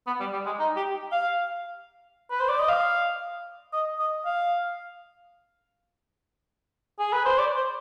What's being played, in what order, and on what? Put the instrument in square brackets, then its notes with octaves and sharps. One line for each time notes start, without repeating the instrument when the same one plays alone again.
[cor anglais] B3
G3
G3
G#3
D#4
G4
F5
B4
C5
D5
D#5
F5
D#5
D#5
F5
G#4
B4
C5
D5
C5